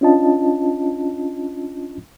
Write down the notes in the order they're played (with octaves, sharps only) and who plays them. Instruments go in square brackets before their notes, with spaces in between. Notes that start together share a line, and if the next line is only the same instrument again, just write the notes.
[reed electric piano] C#4 D4 F4 D#5 A5